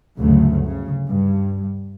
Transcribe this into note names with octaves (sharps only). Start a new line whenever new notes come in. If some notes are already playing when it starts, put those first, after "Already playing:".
D2 G2 C#3 F#3 A3
C#3
G2